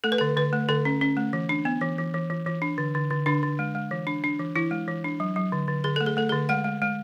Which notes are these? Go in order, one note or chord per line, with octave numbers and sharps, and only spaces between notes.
A3 A4
B4
A4
D3
D3 B4
A3
D3 A4
C#4
C#4
A3
E3
D4
B3
E3
E3
E3
E3
E3
D4
D3
D3
D3
D3 D4
D3
G#3
G#3
E3
D4
D4
E3
E3 E4
G#3
E3
D4
F#3
F#3
D3
D3
D3 G#4
A3 A4
G#4
A3 A4
G#4
D3
G#3 F#5
G#3
G#3